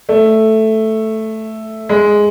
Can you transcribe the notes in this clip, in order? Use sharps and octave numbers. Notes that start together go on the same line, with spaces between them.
A3
G#3